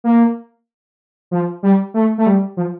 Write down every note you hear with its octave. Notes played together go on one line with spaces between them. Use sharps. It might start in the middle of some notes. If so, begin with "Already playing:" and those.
A#3
F3
G3
A3
A3
G3
F3